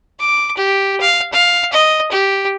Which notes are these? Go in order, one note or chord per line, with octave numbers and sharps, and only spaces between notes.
D6
G4
F5
F5
D#5
G4